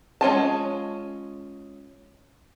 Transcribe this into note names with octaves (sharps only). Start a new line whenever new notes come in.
G#3 C#4 F4 A5